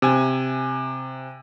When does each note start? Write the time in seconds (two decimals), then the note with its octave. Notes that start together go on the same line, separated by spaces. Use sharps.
0.02 C3 G#5